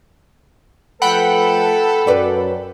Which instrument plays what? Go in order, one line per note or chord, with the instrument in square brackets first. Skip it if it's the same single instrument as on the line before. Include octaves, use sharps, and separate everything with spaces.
[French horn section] F3 A3 B4 [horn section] A4 [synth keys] F#5 G5 B5
[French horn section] F#2 [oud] B4 D5